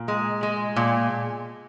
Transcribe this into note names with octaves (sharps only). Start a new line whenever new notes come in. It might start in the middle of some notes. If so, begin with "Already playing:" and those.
Already playing: A#2
G#3
G#3
A#2